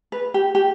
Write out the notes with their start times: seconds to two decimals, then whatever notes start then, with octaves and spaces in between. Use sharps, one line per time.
0.12 B4
0.34 G4
0.55 G4